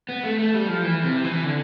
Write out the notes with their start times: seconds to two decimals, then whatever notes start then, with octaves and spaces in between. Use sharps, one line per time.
0.09 B3
0.23 A3
0.39 A3
0.54 G3
0.68 F3
0.83 E3
1.03 C3
1.24 E3
1.44 D3